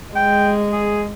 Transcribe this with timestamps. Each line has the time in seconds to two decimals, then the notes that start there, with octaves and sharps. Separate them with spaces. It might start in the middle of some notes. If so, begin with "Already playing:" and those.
0.16 G#3 G5
0.72 G#4